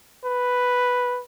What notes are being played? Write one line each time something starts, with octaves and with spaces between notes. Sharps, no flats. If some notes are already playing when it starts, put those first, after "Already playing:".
B4